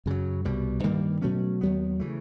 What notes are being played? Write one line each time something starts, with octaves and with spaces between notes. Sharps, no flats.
F#2 C#3 F#3
C2 B2 G3
G2 D#3 G3 A#3
B2 F#3 A3 C#4
D#2 D#3 F#3 B3
C#3 E3 A3